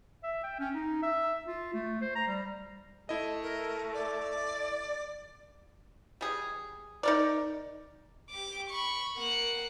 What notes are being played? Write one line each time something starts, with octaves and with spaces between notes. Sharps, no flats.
E5
G5
C#4
D#4
E5
F4
A3
C5
A#5
G3
A3 E4 D#5
A#4
D5
G3 G#4
D#4 A#4 D5
G4 D6
B5 C#6
A#3 F#5